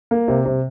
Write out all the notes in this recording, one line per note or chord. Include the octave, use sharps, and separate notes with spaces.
A#3
C3
C3